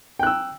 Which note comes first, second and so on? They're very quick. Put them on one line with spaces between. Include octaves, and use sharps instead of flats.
G5 F#6 E6